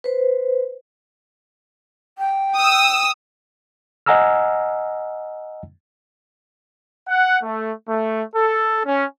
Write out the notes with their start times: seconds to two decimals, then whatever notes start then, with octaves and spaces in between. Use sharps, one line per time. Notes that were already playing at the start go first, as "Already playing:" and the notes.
0.04 B4 C5
2.18 G5
2.56 D#6 E6
4.06 D#5 F#5 G#5 A#5 E6 F6
7.08 F#5
7.42 A3
7.88 A3
8.36 A4
8.86 C#4